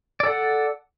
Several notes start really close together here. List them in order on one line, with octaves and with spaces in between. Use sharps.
D5 A4 F#5